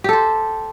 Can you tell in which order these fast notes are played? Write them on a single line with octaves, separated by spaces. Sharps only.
G4 A4 C5